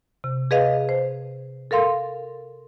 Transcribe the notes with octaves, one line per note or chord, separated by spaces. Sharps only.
C3
G#4 B4 D#5 F5
C5
A4 A#4 F5 C6